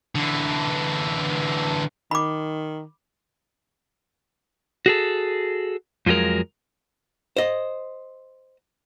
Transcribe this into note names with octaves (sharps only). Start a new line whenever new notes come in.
D3 E3
D#3 B5 D6
F#4 G#4 A4
F2 F3 F#3 G#3 A#4
C5 D#5